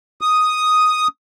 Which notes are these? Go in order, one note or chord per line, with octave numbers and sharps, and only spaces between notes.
D#6